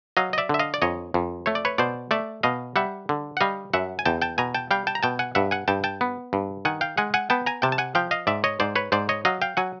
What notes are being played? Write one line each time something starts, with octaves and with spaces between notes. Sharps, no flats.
F#3 D#5 F5
D#5
D5 E5
D3 E5
D#5 F5
D5
F2 C#5 D#5
F2
A3 C#5
D5
B4 C#5
B2 C5 D5
A3 D5 E5
B2 D#5 F5
G3 E5 F#5
D3
F#5
G3 D#5 F5
F#2 E5 F#5
G#5
E2 G5 A5
G5 A5
B2 G#5 A#5
G5 A5
G3 F5 G5
G5 A5
A#5
B2 G5 A5
F#5 G#5
G2 E5 F#5
F#5 G#5
G2 G5 A5
G5 A5
B3
G2
D#3 F#5 G#5
F5 G5
G#3 F#5 G#5
F#5 G#5
B3 G5 A5
G#5 A#5
C3 G5 A5
A5
F#5 G#5
F3 F5 G5
D#5 F5
G#2 D5 E5
C#5 D#5
G#2 C5 D5
B4 C#5
G#2 C5 D5
C#5 D#5
F#3 D#5 F5
F5 G5
F#3 F#5 G#5